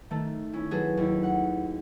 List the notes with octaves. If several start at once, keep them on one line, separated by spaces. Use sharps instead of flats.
D#3 A3 A4
C#4 E4
F#3 F#4 G#4 A4 B4
D#2 E4
F#5